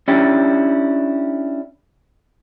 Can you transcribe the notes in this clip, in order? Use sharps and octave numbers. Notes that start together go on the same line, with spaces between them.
C#4 D4 E4 G4